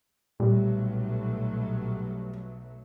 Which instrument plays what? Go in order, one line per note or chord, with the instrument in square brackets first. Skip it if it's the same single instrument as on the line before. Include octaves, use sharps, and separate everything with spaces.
[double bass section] B1 F#3 A3 [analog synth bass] A#2 [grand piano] G3